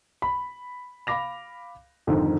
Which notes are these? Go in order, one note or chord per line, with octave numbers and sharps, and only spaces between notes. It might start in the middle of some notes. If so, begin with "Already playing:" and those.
B5
F5 B5 D6 A#6 F7
F2 G#2 D3 D#3